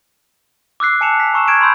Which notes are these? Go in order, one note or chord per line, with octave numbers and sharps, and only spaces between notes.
D6 E6 F#6 C7
G#5 A5 C#7 E7 F7
B6
A#5 C#6 E6 E7
F6 G#6 D7 E7
B5 C6 E6 G6